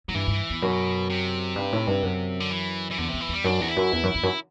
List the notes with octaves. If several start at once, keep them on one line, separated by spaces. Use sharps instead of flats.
A2 F#3
G2 E3
G2
E2
F#2 B2
C3
G2
A2
G2
F#2
D3
E3
E3
E2 D3
C3
E2
E3
E2 G3
F#2 D4
E2 F#4
E4
F#2
E2
F#2
E2
F#2